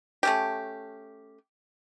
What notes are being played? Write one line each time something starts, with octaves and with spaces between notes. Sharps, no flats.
A3 C#4 G4